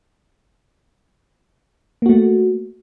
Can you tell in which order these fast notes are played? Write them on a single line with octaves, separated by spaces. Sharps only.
A#3 F#4 A3